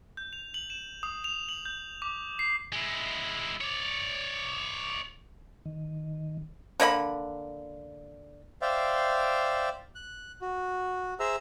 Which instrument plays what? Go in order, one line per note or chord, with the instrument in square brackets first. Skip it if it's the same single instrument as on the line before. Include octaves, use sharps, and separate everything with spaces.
[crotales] G6
F7
F#7
E7
D#6
F7
F#7
G6
D6
C7
[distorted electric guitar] G#3 E4
C#5 D5
[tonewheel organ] D#3
[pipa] D3 A#3 D#5 B5
[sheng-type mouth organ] C5 D5 E5 F5 G5
F#6
F#4
G#4 C5 E5 A#5 E6